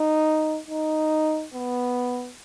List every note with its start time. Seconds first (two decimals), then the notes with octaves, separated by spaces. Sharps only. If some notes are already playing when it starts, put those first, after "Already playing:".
Already playing: D#4
0.68 D#4
1.54 B3